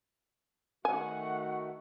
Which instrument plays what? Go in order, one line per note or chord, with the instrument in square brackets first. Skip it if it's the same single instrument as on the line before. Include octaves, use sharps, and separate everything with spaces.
[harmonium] D#3 A3 F#4 [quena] F#5 [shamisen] G#5